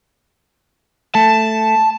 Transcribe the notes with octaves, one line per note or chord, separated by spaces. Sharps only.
A3 A5